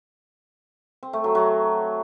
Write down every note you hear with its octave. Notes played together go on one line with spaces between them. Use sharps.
C4
A3
F#3
F#3